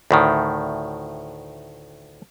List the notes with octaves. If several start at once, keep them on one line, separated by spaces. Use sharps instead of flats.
D2 A2 D#3